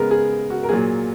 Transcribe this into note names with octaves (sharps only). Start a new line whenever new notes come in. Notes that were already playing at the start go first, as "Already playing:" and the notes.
Already playing: C#3 G#3 B3 A#4
G#4
F#4
A#4
A#2 F#3 A#3 G#4